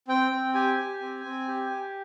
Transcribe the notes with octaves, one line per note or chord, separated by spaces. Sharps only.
C4 G5
C4
G4 G#5
G4
C4
C4
G4
G4